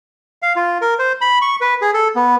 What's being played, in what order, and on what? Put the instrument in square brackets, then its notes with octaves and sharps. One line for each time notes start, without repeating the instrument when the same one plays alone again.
[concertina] F5
F4
A#4
C5
B5
C#6
B4
G#4
A4
B3